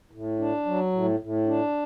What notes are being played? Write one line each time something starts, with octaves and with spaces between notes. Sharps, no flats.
A2
D4
F#3
A2
A2
D4